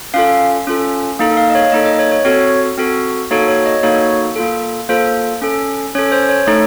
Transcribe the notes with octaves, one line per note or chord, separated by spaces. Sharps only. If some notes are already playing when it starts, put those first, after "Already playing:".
C#4 F4 A4 F5
C#4 F4 A4
A#3 D#4 A4
F5
D#5
C#5
A#3 D#4 A4 D#5
D#5
C#5
C#5
C4 F#4 A4 C#5
C4 F#4 A4
A#3 D#4 F#4 A4 C#5
C#5
D#5
A#3 D#4 F#4 A4 C#5
A#3 F4 A4
A#3 F4 A4 C5
C#4 A4
C#4 A4 C#5
C5
C#5
A3 D#4 A4 C#5